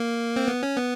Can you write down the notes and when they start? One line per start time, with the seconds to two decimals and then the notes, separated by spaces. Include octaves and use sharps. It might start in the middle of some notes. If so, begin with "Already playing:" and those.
Already playing: A#3
0.36 C4
0.48 B3
0.63 C#4
0.77 B3